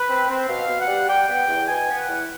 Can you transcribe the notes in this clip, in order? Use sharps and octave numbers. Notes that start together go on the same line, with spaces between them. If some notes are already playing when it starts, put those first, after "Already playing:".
Already playing: B4
C4
C4
B2 F5
B2
F#5
G3
G3 G5
B3
E2
B2 G#5
B3
F#5
E2